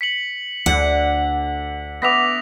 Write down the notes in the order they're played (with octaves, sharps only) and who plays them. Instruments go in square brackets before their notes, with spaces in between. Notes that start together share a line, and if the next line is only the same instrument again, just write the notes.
[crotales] B6 C#7 F#7
[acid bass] D2 [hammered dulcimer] D3 [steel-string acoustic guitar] F#5
[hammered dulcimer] B3 E5 D6 [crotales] A#6 B6 F7